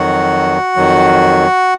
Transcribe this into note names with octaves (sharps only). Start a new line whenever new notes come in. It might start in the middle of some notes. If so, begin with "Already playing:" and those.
Already playing: F2 D#3 F#3 F#4 F#5
F2 D#3 F#3